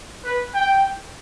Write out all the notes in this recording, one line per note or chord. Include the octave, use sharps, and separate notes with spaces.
B4
G5